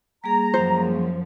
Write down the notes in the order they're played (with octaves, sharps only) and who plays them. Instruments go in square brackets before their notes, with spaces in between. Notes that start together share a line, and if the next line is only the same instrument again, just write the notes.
[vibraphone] G3 A#3 G#4 [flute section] A#5
[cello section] F#2 F3 [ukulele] C5